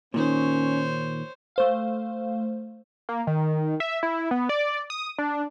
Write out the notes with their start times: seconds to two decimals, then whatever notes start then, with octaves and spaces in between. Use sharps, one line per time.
0.14 A#2 D#3 C#4 C5 C#5
1.56 A3 C5 F5
3.09 A#3
3.27 D#3
3.80 E5
4.03 E4
4.31 B3
4.49 D5
4.90 D#6
5.18 D4